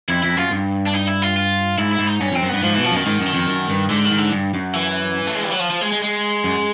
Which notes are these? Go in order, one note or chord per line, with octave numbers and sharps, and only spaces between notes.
F2 E4
F2 E4
F#2 F4
G2
D4
D#4
E4
F4
F4
G#2 E4
E4
G#2
D#4
G2 C#4
F2 C4
F#2
G2 B3
G#2 F3
B2 E3
F3
F#2 D#3
G#2 D#3
F#2
D#3
F2
F#2
G2
G#2 D3
D#3
G#2
D3
G2
F#2
E3
A3
G#3
G3
F#3
F3
F3
G#3
G#3
G#3
F#2